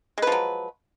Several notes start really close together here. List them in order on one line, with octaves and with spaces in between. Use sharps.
G#3 B4 F3 F#3